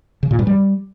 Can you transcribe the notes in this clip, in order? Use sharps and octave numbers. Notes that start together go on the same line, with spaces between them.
C#3
A#2
G2
G3